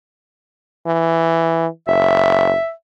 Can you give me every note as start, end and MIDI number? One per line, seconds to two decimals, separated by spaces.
0.87 1.67 52
1.88 2.52 30
1.88 2.71 76